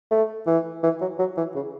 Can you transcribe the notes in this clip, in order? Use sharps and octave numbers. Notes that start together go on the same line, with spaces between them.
A3
E3
E3
F#3
F#3
E3
C#3